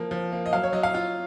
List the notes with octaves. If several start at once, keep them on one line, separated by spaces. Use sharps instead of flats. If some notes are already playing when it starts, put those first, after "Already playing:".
Already playing: F3 A#3
F3
A#3
D#5
F#3 F5
C#5
F#3 D#5
F5
F4